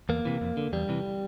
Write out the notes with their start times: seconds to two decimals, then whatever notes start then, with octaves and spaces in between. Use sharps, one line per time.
0.09 E2 A#3
0.25 C3 E3
0.41 F2
0.57 D3
0.73 E2 G3
0.89 C3 E3